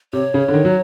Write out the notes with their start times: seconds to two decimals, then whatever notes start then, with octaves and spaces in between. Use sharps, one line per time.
0.13 C3 C#5
0.34 C#3
0.48 D3
0.54 D#3
0.65 F#3